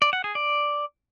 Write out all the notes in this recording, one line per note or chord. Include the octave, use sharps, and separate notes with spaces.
D5
F#5
G#4
D5